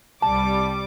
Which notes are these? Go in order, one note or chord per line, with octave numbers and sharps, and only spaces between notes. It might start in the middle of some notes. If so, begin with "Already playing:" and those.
C2 G3 A5 D6